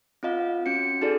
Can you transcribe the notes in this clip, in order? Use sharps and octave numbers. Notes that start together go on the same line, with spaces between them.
C4 F4 D#5 F5
C#4 F#4 C#7
D#4 F#4 G#4 A4 D5